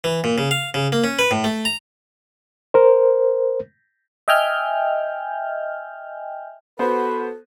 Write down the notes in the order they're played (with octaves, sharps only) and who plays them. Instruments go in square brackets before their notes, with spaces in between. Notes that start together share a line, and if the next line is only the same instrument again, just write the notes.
[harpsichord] E3
A#2
C#3
F5
C#3
A#3
C#4
B4
A2
A3
A#5
[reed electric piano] A#4 C5
[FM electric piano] D#5 E5 G5 G#5 F6 G6
[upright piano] B3 C5 [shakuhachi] F#4 [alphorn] A4 [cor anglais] B4